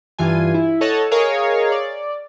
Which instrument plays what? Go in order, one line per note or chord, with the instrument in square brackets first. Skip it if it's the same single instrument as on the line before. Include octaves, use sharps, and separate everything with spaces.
[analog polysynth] G2 E3 F4 G#5
E4
A4 C#5 D#5 F#5 A5
G#4 A#4 C#5 D#5 F5
D5